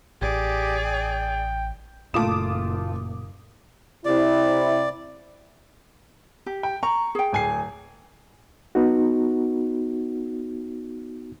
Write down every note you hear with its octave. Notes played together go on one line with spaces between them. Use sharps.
A1 G4 G#4 D5
G5
F#1 A#2 A3 F4 D6 D#6 E7
C3 E4 D5
G4
G5
A#5 C#6
G#4 G5
D1 G#5 C7
B3 D#4 F#4